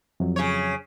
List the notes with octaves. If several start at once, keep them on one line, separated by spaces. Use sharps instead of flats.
F2 F#3
C#3 C#5